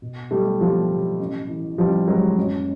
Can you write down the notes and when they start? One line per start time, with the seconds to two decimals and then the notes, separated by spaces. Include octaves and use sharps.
0.02 B2
0.31 B1 G3 A3
0.60 B1 F3 G3
0.90 B1
1.19 A1
1.49 E3
1.78 A1 F3 G3
2.08 A1 F#3 G#3
2.37 F#1